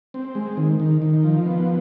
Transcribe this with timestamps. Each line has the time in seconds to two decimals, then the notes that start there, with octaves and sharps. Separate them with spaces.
0.14 C4
0.35 G#3
0.57 D#3
0.80 D#3
1.02 D#3
1.24 F3
1.46 B3